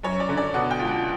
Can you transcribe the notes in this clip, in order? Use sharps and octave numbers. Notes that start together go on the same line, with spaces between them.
F#2 C#5
D5
D3
D5
B2 F#5
G5
C#2
F#5